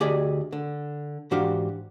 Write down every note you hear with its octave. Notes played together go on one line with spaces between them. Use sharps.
D2 G4 G#4 D5 D#5
D3
G#2 E3 D4 F#4 G4 F5